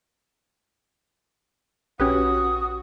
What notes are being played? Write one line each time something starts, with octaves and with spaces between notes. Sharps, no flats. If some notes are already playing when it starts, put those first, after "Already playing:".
A#1 C#4 F#4 G4 B4 D#6